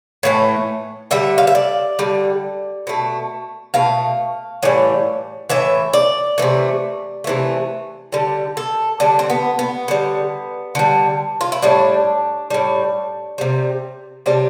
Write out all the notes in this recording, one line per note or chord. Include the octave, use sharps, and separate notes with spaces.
A2 E3 A3
D3 G3 E5
F5
E5
D5
D3 G3
B2 A3
B2 A3 F5
A2 E3 G3
A2 E3 E5
D5
C3 E3 A3
C3 E3 A3
D3 G3
A4
D3 G3 D4
C4
B3
B3
D3 G3
D3 G3
F4
E4
A2 G3 D4
A2 G3
C3 G3
C3 G3 D4